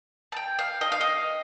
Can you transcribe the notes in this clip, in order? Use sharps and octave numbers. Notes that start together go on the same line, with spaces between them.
A5
G5
F5
D#5
F5
D#5